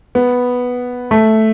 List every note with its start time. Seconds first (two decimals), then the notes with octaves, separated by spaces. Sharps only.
0.15 B3
1.11 A3